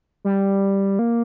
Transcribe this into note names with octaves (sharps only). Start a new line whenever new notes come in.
G3
A#3